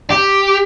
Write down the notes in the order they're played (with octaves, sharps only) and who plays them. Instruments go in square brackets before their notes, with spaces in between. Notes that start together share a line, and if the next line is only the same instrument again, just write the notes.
[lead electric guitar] G4